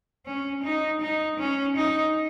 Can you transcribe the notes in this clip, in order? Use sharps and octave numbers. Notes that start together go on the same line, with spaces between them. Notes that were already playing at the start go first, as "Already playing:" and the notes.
C#4
D#4
D#4
C#4
D#4